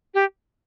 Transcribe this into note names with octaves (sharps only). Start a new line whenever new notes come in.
G4